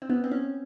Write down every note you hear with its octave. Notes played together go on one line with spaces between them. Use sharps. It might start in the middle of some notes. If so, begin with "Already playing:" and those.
C4
B3
C4
C#4